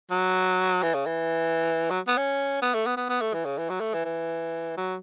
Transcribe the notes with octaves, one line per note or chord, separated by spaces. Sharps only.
F#3
E3
C#3
E3
F#3
B3
C#4
B3
A3
B3
B3
B3
A3
E3
C#3
E3
F#3
A3
E3
E3
F#3